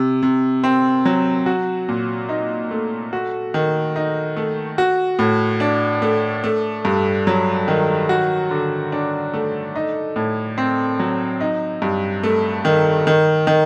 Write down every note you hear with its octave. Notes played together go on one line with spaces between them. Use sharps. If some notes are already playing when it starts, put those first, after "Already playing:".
Already playing: C3
C3
C4
F#3
F#4
A#2
D#4
A3
F#4
D#3
D#4
A3
F#4
A2
D4
A3
A3
G2
F#3
D#3
F#4
D3
D4
A3
D#4
A2
C4
F#3
D#4
G2
A3
D#3
D#3
D#3